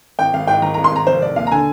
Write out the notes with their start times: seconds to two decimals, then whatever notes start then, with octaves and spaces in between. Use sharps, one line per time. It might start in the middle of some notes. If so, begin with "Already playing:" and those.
0.19 G#1 G5
0.34 G#1 F5
0.47 G#2 G5
0.62 D#3 A#5
0.74 G#1 A#5
0.84 C6
0.92 G#1 A#5
1.07 F1 C5
1.21 F1 D5
1.36 D#2 F5
1.47 A#5
1.51 D3 G#5